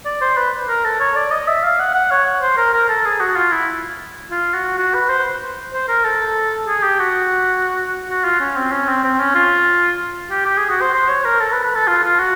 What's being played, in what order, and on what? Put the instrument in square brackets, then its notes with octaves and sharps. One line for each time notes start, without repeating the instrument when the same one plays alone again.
[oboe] D5
C5
B4
A#4
A4
C#5
D5
D#5
E5
F5
F#5
F#5
C#5
C5
A#4
A#4
A4
G#4
F#4
F4
E4
F4
F#4
F#4
B4
C5
C5
A#4
A4
G#4
G4
F#4
F#4
F4
C#4
C4
C#4
C4
C4
C#4
F4
G4
G4
G#4
F#4
C5
C5
C#5
A#4
A4
B4
B4
A4
F4
F4
F#4